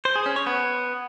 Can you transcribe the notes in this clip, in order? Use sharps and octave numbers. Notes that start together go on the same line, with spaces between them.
C5
G#4
C#4
C#5
B3